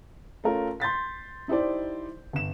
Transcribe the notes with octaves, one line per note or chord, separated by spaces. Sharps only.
A3 C#4 F4 A#4
C6 G6 A6 B6
D#4 E4 G4 C5 D5
G1 E7